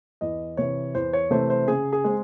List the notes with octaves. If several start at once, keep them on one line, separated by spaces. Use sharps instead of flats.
E2 D#5
C3 E3 C#5
E2 C5
C#5
C3 E3 A3 C4 C5
C5
C#3 G#4
G#4
G#3 C4